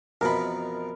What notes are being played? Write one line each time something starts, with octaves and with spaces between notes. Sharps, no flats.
F2 B2 E3 A#4 B5